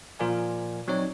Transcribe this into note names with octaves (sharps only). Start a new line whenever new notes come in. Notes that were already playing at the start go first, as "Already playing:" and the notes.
A#2 F3 F4 A#4 D5 G#5
F#3 C4 D#4 C#5 D5